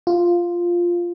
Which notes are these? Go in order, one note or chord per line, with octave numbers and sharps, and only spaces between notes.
F4